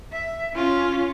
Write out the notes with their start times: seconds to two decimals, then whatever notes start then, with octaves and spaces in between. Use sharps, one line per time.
0.13 E5
0.56 C#4 F4